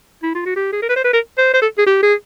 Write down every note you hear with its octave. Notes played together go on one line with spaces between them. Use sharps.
E4
F4
F#4
G4
G#4
A#4
B4
C5
B4
A#4
C5
C5
A4
G#4
G4
G#4